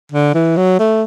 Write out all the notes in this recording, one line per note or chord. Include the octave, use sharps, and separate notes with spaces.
D3
E3
F#3
A3